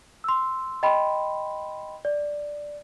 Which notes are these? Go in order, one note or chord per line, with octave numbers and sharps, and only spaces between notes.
C6 E6
D#5 G5 B5 C6
D5